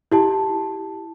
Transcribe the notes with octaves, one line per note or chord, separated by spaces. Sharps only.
E4 G4 A5